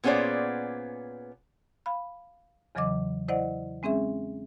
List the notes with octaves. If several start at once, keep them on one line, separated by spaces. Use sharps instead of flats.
A#2 B3 C#4 G#4 C5 D5
F5 B5
E2 C#3 E3 F#3 D#5 D6
E4 C5 D5 D#5 F#5
G#3 C4 C#4 G#4 E5